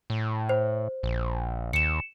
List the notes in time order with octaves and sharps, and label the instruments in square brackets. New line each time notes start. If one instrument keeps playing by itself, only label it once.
[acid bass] A2
[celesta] C5
[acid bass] A#1
[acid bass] D#2 [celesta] C#7 E7